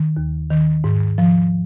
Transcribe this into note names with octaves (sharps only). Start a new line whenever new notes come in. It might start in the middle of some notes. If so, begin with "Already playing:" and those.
Already playing: D#3
D#2
D#3
G#2
F3